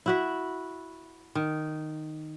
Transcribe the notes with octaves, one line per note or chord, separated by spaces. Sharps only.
E4 F#4 E5
D#3